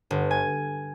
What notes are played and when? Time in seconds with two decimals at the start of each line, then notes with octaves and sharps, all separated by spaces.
0.11 G1
0.31 G#5